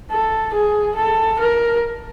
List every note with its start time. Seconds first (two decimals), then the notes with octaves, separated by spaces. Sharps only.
0.11 A4
0.54 G#4
0.96 A4
1.40 A#4